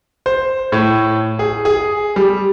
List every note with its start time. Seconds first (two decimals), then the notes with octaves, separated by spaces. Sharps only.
0.26 C5
0.72 A2
1.39 G#4
1.65 G#4
2.16 G3